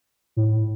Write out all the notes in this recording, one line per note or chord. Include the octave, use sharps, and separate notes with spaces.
A2